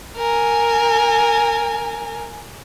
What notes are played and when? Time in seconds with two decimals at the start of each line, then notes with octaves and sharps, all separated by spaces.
0.16 A#4 G#5